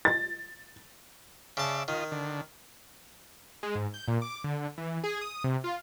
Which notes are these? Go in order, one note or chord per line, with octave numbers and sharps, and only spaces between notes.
A6
C#3 D5 E5 A5
D#3 F4 D#5
D3
G#3
G#2
G6
A#2
D6
D3
E3
G#4
D#6
C3
F4